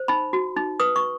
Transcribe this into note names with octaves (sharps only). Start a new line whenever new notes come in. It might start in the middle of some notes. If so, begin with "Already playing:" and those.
Already playing: C5
D#4 B5
F#4
D#4
B4 D#6
C#6